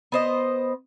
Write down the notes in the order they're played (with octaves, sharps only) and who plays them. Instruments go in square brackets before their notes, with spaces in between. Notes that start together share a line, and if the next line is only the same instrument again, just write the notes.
[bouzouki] B3 C5 D#5